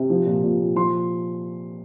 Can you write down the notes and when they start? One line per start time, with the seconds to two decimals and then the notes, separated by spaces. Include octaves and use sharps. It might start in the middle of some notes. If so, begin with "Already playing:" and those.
Already playing: C3
0.10 F3
0.26 A#2
0.43 A#2
0.60 A#2
0.76 F3 C6